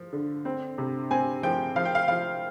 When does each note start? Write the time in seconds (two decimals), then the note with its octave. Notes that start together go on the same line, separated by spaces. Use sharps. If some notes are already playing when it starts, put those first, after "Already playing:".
Already playing: F3
0.13 D3
0.45 C4
0.78 C3
1.11 C4 G#5
1.43 F3 G5
1.76 F3 F5
1.85 G5
1.95 F5
2.08 F3 F5